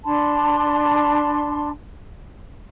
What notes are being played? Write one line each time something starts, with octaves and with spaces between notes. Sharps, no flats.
D4 A5 B5 C6